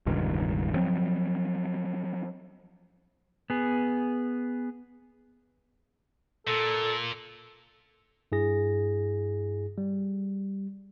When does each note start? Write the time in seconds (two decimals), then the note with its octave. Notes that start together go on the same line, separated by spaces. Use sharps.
0.06 E1 C#2 G2 D#3
0.75 F3 F#3 C4
3.50 B3 G#4
6.47 A#2 A4
8.32 G2 E4 G#4 A#6
9.78 G3